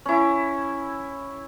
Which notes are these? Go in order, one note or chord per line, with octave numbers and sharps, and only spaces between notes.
C#4 E4